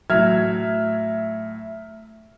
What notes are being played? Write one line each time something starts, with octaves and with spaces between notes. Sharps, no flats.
A2 F#3 E5 F6 G#6